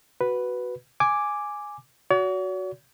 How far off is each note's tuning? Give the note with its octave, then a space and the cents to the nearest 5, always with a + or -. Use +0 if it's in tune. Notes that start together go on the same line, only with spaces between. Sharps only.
F#4 +5 B4 +0
G#5 +0 D6 +0
F#4 +0 C#5 +45